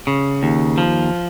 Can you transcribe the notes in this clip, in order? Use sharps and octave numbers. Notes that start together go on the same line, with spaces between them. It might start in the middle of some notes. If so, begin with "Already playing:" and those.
C#3
D#2
F3